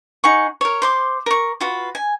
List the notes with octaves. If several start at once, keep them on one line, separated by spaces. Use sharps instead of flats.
D#4 G#4 F#5 C#6
A#4 C#5
C5 C6 D6
A#4 C#6
F4 F#4 B4
G#5